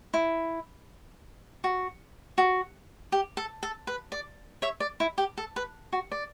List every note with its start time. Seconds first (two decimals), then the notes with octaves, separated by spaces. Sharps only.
0.14 E4
1.64 F#4
2.38 F#4
3.12 G4
3.37 A4
3.63 A4
3.87 B4
4.12 D5
4.62 C#5 E5
4.80 D5
5.00 E4
5.18 G4
5.38 A4
5.56 B4
5.93 F#4
6.12 D5